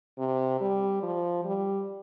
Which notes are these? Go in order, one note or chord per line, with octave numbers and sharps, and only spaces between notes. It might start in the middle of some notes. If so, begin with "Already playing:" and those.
C3
G3
F3
G3